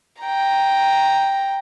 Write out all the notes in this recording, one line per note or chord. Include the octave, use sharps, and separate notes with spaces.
G5 A#5